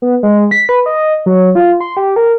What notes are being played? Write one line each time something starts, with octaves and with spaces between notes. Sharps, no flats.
B3
G#3
B6
B4
D#5
F#3
F4
C6
G4
A#4